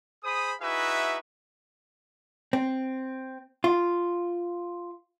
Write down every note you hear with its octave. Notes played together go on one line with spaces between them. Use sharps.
G#4 C5 B5 D#6
D#4 E4 F#4 G#4 B4 E5
C4
F4